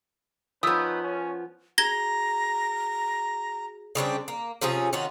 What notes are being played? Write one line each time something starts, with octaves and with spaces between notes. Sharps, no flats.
F3 B3 C#4 D#4 B4 D#6 E6
C#4
F#4 G#4 A#5 G#6 A#6 G7
C#3 G3 C4 D4
A#3
C3 F3 C#4 G#4
D#3 C#4 F4 F#4